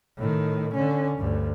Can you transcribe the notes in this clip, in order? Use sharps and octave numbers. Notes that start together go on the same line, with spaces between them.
A2 D#3
D3 C#4
D2 G2